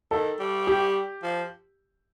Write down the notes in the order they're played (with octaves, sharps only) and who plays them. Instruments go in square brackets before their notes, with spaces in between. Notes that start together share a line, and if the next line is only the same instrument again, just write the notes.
[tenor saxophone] D#3 [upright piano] A4
[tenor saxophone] G3
[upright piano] G4
[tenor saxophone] F3